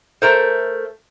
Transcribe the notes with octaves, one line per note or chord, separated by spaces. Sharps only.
A3 A#4 C5